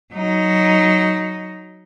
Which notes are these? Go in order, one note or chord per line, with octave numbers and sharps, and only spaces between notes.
F#3 D#4